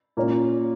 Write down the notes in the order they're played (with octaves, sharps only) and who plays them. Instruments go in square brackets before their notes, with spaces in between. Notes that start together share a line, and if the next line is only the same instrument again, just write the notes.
[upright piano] A#2 A#3 C#4